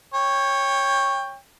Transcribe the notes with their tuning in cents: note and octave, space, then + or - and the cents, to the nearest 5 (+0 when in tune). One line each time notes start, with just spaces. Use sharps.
C#5 -5 G5 +20